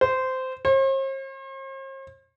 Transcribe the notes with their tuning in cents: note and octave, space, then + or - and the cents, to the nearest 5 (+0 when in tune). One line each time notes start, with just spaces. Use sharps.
C5 -15
C5 +45